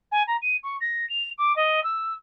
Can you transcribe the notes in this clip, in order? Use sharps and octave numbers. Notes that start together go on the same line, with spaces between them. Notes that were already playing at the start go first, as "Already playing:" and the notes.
G#5
A#5
D#7
C#6
A#6
F7
D6
D#5
E6